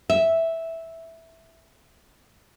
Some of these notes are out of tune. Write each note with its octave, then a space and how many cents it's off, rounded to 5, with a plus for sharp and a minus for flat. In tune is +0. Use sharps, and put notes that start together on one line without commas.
E5 -5